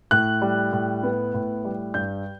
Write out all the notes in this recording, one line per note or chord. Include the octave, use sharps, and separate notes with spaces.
A2 F#6
G3
A2
B3
A2
G3
G2 G6